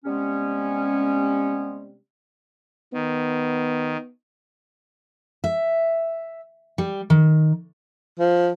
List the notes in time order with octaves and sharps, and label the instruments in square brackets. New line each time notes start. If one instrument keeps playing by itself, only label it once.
[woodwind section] C3 G3 G#3 B3 C#4
[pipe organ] D#3 [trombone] B3
[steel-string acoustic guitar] E5
G3
D#3
[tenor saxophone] F3